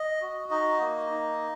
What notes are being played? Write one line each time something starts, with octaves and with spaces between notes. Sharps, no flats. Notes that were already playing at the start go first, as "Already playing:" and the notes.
Already playing: D#5
F#4
D#4 D#5
A#3
D#4